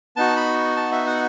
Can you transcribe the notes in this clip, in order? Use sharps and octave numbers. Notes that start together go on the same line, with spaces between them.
B3 D#4 F#4 A5
B5
A5
E5
F#5